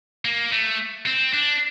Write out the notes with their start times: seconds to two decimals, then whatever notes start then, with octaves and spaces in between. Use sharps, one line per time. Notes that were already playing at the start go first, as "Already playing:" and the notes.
0.25 A#3
0.52 A3
1.06 C4
1.33 D4